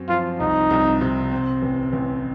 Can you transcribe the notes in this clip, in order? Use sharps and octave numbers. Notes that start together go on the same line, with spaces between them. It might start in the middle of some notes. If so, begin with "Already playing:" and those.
Already playing: F#2 C4
F3 F4
C2 D#4
C2
C3
C4
A1
A1